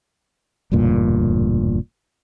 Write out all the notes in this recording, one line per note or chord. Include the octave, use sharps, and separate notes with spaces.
E1 D2 G2 A#2